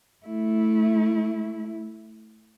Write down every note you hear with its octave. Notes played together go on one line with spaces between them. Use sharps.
A3 E4